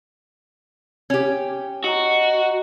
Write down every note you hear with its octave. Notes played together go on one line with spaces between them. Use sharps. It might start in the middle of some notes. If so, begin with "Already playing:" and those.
C#4 G4
F#4 D#5 A#5